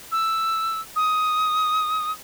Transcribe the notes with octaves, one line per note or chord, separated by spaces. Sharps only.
E6
D#6